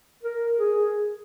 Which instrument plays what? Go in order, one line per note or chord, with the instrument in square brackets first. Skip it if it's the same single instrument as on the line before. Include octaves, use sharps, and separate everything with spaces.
[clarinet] A#4
G#4